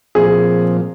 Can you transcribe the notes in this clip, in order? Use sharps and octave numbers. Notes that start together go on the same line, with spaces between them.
A#2 F3 C4 G#4